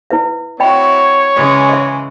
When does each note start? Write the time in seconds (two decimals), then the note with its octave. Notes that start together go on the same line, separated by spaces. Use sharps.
0.10 E4 B4 E5
0.60 C4 E4 F#4 C#5 D#5 G5 B5
1.34 C#3 E3 G#3
1.69 D#5 E5